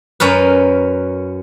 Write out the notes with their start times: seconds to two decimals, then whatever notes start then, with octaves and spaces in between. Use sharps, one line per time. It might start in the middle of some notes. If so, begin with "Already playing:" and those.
0.20 F#2 C#4 A#4 B4